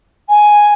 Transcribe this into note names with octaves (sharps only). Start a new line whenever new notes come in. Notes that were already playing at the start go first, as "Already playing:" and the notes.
G#5